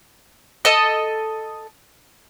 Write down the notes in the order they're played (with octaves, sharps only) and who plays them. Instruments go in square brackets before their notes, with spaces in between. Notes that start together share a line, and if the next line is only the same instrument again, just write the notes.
[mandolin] A4 D#5